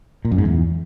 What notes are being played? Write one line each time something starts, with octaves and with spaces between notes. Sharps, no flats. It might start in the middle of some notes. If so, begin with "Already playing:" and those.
A#2
F#2
G#2
E2